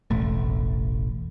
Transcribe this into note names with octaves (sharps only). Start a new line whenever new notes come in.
E1 A1 A3